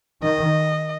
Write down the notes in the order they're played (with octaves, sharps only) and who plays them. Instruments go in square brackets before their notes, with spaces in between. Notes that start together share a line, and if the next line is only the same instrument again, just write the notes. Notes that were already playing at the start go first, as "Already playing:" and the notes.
[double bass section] D#3 [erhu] D#5